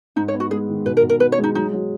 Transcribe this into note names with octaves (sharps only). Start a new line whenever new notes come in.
G#2 D#4
C#5
B3
F#4
G#3 G#4
D#3
B2 B4
A#4
B2
A#4
B3 B4
C#5
G#3
D#4
F#3 D#4
F#3